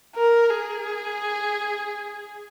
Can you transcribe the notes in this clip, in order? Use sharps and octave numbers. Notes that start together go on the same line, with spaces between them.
A#4
G#4